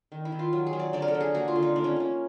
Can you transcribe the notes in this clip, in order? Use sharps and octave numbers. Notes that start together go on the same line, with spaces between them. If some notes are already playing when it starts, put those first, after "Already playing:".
D#3
E4
D#3
F4
F#3
G#4
F#3
D5
D3 D5
A#4
A4
D3
G#4
A#3 F#4
F4
D3
D#4
A#3 D4
C#4
A#3 C#4